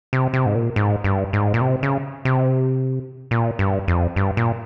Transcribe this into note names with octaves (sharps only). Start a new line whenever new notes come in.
C3
C3
G#2
A#2
G#2
G2
G#2
A#2
C3
C#3
C3
A#2
G2
F2
G2
A#2